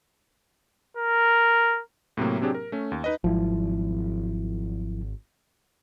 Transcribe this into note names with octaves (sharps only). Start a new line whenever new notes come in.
A#4
A2 C3 F#3 A#3
C3 F#3 C4 D4 G4 G#4
A#4
A3 C#4
D#2
D#4 B4 D#5
G#1 F3 F#3 E4